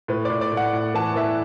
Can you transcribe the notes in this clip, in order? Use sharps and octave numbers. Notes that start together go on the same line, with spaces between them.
A2 B4
A2 D5
D5
A2
F#5
A2
E3 A5
E3 E5